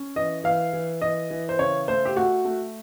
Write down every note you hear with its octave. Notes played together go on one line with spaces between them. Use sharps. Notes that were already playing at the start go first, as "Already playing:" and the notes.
Already playing: C#4
E3 D#5
E3 F5
E3
E3 D#5
E3
C5
C#3 C#5
A3 C5
G4
A3 F#4
A3